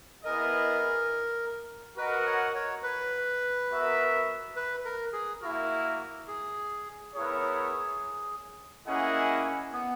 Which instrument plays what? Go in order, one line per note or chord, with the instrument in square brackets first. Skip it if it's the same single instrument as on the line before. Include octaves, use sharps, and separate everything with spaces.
[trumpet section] B3 E4 G#4 D#5 [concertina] A#4
[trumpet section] F#4 A#4 D#5 F#5 [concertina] B4
[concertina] C#5
C#5
B4
[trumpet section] B3 F#4 A#4 E5
[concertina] B4
A#4
G#4
[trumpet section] A#3 E4 A#4 [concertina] F#4
[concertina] G#4
[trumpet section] B3 E4 A#4 C#5 [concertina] G#4
[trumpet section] A#3 E4 G#4 D#5 F#5 [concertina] C#4
[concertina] B3